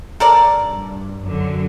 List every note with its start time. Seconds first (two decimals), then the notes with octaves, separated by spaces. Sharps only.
0.20 A4 A#4 D5
0.56 G2
1.24 F#2 D3 F#3